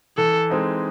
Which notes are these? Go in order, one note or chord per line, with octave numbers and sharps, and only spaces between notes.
E3 A4
G#3 C4 D#4